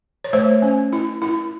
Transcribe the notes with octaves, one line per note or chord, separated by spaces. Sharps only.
C#5
A3 C5
C#4
E4
E4